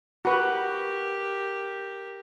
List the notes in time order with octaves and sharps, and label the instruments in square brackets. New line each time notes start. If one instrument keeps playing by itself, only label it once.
[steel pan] F#4 B4 [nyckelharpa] G4 A#4